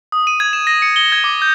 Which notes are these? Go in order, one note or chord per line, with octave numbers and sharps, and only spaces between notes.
D#6
D#7
G#6
E7
A#6
C#7
G7
G#6
D6
G6